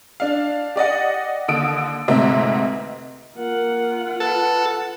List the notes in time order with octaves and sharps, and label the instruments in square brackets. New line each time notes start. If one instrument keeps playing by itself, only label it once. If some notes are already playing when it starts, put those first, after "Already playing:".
[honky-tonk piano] D4 F5
G4 D5 D#5 F#5
D#2 D3 D#6 E6 D7
F1 D2 G#2 C3 C4 E5
[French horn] A#3 [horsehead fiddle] F4 F#5
[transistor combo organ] A4 [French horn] B4